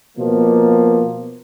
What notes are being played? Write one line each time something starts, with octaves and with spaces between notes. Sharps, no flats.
B2 F3 A#3